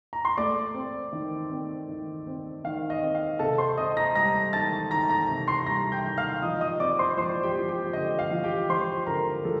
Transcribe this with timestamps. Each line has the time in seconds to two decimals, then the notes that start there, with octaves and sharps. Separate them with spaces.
0.13 A#5
0.25 C6
0.38 A3 D5 D6
0.74 C4
1.13 D#3
1.50 C4
1.89 D#3
2.27 C4
2.64 D#3 F5
2.90 D#5
3.02 C4
3.15 F5
3.39 C3 A4 A5
3.58 C5 C6
3.77 C3 D#5 D#6
3.97 A#5 A#6
4.15 G3 A#5 A#6
4.53 D#3 A5 A6
4.91 D#3 A#5 A#6
5.09 A#5 A#6
5.29 C3
5.48 C6 C7
5.66 G3 A#5 A#6
5.92 G5 G6
6.04 D#3
6.18 F5 F6
6.42 F3 D#5 D#6
6.61 D#5 D#6
6.80 C4 D5 D6
6.99 C5 C6
7.17 F3 C5 C6
7.43 G4 G5
7.56 F3
7.68 G4 G5
7.93 D3 D#5
8.19 F5
8.31 F3
8.44 G4 G5
8.69 F3 C5 C6
9.07 D3 A#4 A#5
9.45 F3 A4